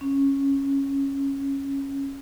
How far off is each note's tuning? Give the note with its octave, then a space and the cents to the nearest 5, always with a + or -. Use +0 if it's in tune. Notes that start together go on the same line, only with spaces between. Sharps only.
C#4 -10